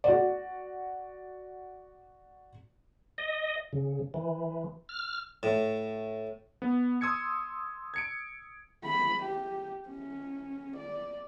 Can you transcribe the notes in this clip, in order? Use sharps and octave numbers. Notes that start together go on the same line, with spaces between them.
F#4 D5
D#5
C#3
E3
F6
A2
B3
C6 D#6 E6 G#6 C#7
G#6 C#7 D7
B5
G4
C#4
D5